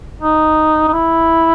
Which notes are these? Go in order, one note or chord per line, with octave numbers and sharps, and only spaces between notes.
D#4
D#4
E4